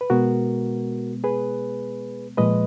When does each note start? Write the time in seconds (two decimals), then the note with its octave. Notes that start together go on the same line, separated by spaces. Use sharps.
0.01 B4
0.10 B2 G#3 B3 F#4 A#4
1.24 G#4 B4
2.37 A#2 F3 G#3 B4 D#5